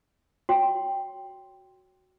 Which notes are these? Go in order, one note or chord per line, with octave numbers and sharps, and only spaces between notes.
F#4 C#5 G5 C6